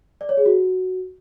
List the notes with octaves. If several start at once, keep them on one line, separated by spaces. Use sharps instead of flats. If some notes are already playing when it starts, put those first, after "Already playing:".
D5
C#5
G#4
F#4